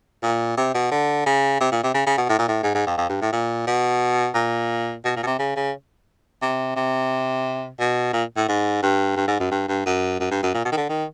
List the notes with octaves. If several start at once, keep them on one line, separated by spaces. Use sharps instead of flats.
A#2
C3
B2
D3
C#3
C3
A#2
C3
C#3
C#3
B2
A2
A#2
A2
G#2
G#2
F2
F2
G2
A2
A#2
B2
A#2
B2
A#2
B2
C3
C#3
C#3
C3
C3
B2
A#2
A2
G#2
G2
G2
G#2
F#2
G2
G2
F#2
F#2
G2
F#2
A#2
B2
D#3
D3
D#3